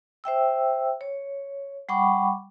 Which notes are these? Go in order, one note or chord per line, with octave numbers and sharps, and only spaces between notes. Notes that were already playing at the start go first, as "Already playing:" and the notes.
C5 E5 G5 E6
C#5
G3 F#5 G5 B5 C#6 D6